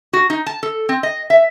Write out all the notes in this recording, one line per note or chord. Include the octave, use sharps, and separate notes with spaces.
F#4
D#4
A5
A4
C4
D#5
E5